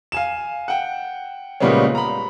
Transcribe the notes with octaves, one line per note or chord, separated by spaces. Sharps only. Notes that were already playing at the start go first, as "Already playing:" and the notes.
F5 G#5 E7
F#5 G5
A#2 C#3 G3 G#3 B3 C#4
A#5 B5